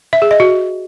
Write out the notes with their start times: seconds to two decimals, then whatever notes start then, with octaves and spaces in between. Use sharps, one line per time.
0.13 E5
0.22 G#4
0.31 D#5
0.40 F#4